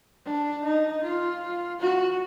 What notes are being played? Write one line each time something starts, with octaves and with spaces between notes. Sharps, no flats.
D4
D#4
F4
F#4